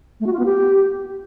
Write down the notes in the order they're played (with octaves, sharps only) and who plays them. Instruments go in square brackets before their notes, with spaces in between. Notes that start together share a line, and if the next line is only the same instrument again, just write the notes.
[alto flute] A3
F#4
F4
B3
G4